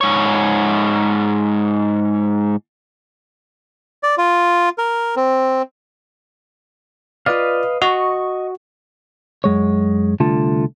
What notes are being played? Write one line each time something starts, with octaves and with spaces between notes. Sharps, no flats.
G#2 C#5
D5
F4
A#4
C4
F4 B4 D5 D#5 F5
F#4 D#5 C#6
F#2 G#3 C#5
C2 D3 A3 F4 A5